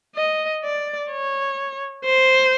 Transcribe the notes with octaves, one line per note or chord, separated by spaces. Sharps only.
D#5
D5
C#5
C5